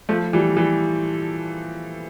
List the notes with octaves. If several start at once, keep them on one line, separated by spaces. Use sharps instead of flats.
F3 A3
E3 G3
E3 G3